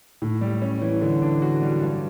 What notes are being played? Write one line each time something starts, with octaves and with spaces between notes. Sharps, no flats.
A2
G3
C#4
E3
D3
D4
F#4
G3
G2